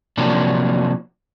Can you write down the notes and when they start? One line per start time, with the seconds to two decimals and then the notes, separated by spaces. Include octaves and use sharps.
0.17 C3 F3 F#3 A#3 D4